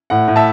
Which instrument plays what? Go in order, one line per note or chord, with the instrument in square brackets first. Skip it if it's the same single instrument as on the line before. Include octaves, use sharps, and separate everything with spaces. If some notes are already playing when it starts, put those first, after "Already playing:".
[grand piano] A2 F#5
A2
E5 A5